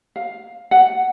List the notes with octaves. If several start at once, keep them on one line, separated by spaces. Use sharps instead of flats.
F5
F#5